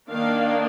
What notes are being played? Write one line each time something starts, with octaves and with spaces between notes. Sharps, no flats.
D#3 A#3 D4 F5